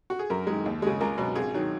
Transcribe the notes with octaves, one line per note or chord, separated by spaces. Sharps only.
F#4
G#4
F#2 A#4
D#3 G#3
D#2
C#3 G#3
C#2 A#4
B2 F#3
G#1 G#4
D#3 F#3